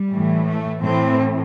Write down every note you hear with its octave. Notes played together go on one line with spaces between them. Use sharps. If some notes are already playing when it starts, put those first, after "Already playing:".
Already playing: G3
A2 E3
A3
A2 E3 C4